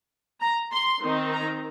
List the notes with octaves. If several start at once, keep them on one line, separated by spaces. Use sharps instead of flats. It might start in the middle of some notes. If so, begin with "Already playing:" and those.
A#5
C6
D#3 C4 D#4
A#5